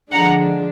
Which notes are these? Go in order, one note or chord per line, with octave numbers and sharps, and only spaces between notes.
D3 F3 G#3 D4 F#5 A#5